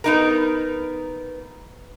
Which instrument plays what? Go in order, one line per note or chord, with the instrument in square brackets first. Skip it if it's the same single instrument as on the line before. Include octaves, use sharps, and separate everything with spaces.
[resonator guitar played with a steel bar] B3 D#4 A#4